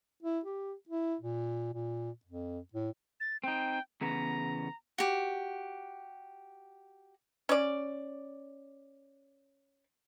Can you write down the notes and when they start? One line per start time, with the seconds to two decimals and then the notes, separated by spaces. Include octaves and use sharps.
0.22 E4
0.45 G4
0.89 E4
1.21 A#2
1.74 A#2
2.25 F2
2.73 A2
3.20 A6
3.44 C4 D#4 G5
4.01 E2 C#3 B3 A#5
4.98 F#4 G4
7.49 C#4 D5